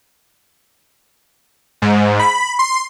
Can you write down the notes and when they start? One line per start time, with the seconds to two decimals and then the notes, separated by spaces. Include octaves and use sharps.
1.82 G#2
2.19 B5
2.59 C6